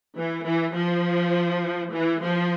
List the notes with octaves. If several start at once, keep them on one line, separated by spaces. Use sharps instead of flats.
E3
E3
F3
E3
F3